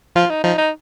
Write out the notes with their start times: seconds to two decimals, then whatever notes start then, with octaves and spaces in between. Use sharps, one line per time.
0.16 F3 F4
0.30 D#4
0.44 F3 D#4
0.58 D#4